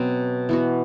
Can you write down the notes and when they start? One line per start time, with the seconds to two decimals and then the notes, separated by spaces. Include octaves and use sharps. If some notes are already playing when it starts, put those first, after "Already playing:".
Already playing: B2 F#3 C4
0.49 E3 B3 F#4